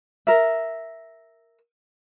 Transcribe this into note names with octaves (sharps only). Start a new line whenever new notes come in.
A#4 E5